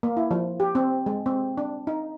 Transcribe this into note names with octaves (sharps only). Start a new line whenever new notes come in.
A#3
E4
F3
G4
C4
G#3
C4
D4
D#4